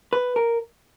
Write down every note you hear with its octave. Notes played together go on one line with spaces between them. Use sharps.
B4
A#4